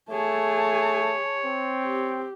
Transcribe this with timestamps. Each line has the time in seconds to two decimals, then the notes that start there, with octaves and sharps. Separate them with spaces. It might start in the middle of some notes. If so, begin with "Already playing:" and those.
0.10 A3 G#4 C#5 A5
1.46 C4
1.86 G4